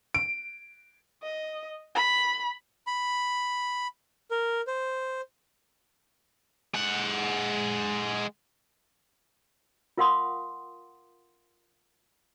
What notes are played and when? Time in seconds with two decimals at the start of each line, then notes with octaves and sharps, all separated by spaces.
0.14 D7
1.23 D#5
1.95 B5
2.87 B5
4.31 A#4
4.67 C5
6.74 G#3 F#5
9.97 F4 A#4 F5 F#5 C6 D#6